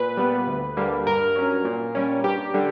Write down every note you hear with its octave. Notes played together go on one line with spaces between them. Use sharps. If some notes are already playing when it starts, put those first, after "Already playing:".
Already playing: A#2 B4
G3 B3
D2
D3 G3 A#3
G2 A#4
F#3 C#4
A#2
G3 C#4
G2 G4
D3 G3